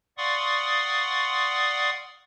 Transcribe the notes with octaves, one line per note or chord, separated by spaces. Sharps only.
D5 F5 F#5 C6 C#6 D#6